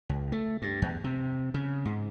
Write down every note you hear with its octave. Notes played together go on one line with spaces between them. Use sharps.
C#2
A3
G2
E2
C3
C#3
G#2